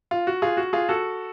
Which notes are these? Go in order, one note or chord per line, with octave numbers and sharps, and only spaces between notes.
F4
F#4
F4 G#4
F#4
F4 G#4
F#4 A4